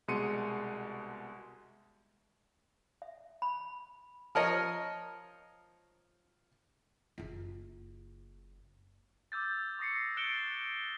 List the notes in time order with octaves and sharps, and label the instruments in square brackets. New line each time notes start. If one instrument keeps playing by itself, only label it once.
[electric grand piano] C2 B2 G#3 C6 C#7 D#7
[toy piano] E5
B5
[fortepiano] F3 A#4 C#5 D#5
[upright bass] F#1 F4
[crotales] D6 E6 G6 A6
C#6 D#6 A#6 C7 C#7
F#6 A6 C#7 D7 E7 G7